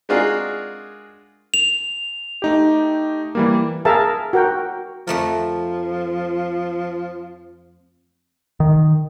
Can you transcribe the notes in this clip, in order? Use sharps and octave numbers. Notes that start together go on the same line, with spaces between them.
G#3 D4 F4 F#4 G#4 A#4
F7
A3 D#4 G4
E3 G3 A#3
G#4 A#4 E5 F5 A5
F#4 A#4 G5
F2 F3 A3 A#4
D#3